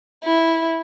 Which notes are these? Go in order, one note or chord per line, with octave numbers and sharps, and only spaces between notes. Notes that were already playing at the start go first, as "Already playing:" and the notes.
E4